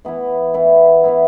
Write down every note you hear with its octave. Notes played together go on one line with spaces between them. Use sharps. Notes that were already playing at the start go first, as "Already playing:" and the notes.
E3 B3 E4
E3 B3 E4
E3 B3 E4